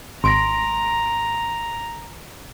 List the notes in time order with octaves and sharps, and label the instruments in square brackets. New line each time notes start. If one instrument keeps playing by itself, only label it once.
[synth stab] G#1 D7 [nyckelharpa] A#5 [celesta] C6 A#6